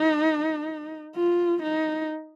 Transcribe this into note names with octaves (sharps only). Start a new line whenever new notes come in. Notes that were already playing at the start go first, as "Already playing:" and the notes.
Already playing: D#4
F4
D#4